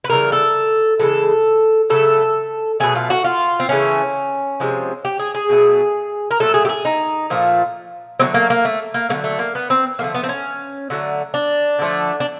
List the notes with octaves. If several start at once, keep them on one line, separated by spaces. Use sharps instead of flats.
B4
C#3 E3 G3 A#4
A4
C#3 E3 G#3 A4
C#3 F#3 A3 A4
B2 F#3 A3 G#4
F4
F#4
F4
C4
C#3 E3 A3 C#4
C3 F3 G#3
G4
G#4
G#4
B2 F#3 A3
A#4
A#2 F#3 A3 A4
G#4
G4
G#4
D#4
A#2 F3 A3
D3 F#3 A3 C4
A#3
A#3
A3
A#3
D3 F#3 A3 A#3
A3
A#3
B3
C4
D3 F3 A3 A#3
B3
C4
C#4
D3 F#3 A3
D4
D3 F3 A3
D4